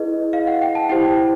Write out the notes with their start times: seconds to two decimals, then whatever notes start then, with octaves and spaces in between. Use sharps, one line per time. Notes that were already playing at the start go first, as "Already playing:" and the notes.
Already playing: E4 G#4 B4 D#5
0.33 F5
0.47 F#5
0.62 G5
0.75 A5
0.89 E4 G4 C5 G5